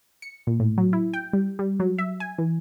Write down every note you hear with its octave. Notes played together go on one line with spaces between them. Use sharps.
C#7
A#2
A2
F#3
E4
G5
G3
G3
F#3
E5
G#5
E3